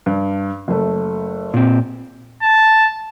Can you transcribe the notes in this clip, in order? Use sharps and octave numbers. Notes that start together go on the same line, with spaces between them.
G2
F#1 A3
A#2 C4
A5